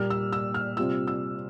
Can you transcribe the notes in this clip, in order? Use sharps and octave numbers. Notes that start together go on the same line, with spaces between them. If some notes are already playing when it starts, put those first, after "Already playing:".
Already playing: A#2 G3 A#3 F6
E6
E6
F6
C3 G3 C4 F4 E6
E6